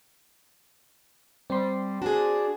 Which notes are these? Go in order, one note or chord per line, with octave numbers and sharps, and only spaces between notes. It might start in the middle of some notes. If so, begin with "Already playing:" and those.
G3 C4 C6
D4 F#4 G#4